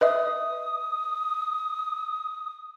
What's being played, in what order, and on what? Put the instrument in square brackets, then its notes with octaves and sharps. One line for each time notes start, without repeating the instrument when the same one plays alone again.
[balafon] B4 D#5 E5 [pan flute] D#6